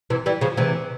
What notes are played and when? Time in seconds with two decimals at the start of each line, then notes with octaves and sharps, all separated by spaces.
0.10 C3 E3
0.26 E3 G3
0.41 C#3 F3
0.57 C3 E3